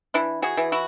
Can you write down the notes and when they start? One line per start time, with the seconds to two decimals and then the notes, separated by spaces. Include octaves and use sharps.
0.14 E3 D4 E4
0.42 F#4 G#4
0.57 E3
0.72 E4 F#4